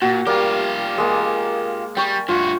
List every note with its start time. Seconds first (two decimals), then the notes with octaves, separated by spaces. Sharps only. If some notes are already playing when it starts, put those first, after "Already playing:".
0.02 A#2 F#4
0.27 G3 A#3 F4 G4
0.98 G#3 A#3
1.97 G3 G5 C#6
2.28 G2 F4 F#4